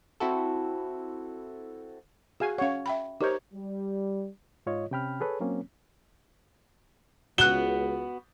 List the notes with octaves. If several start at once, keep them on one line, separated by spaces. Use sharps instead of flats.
C4 E4 F#4 A4
F#4 G#4 F5 G#5
C#4 C#5 F5 F#5
E5 G5 B5
D#4 G4 A#4 C5 C#5
G3
G#2 F4 C#5 D#5
C3 C#4 G5 B5 F6
G#4 A4 B4 C#5
F#3 A#3 C4 C#4
C#2 B3 F#4 F#6 E7 G7